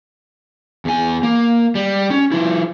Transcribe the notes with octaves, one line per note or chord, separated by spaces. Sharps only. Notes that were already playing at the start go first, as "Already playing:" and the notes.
E2 G#5
A#3
G3
C#4
F3 E4